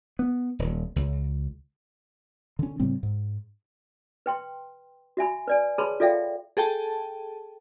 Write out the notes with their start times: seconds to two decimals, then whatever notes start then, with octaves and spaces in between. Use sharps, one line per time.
0.19 B3
0.59 D#1
0.96 C#2
2.59 D3 C#4
2.80 A2 C#3 G3 C4
3.03 G#2
4.26 B4 G5 C6
5.17 F#4 E5 G#5 B5
5.48 B4 D5 G#5
5.78 G#4 B4 C#5 A5 B5 C6
6.00 F4 A4 D5 E5 F5 G5
6.57 G#4 A4 G5 A5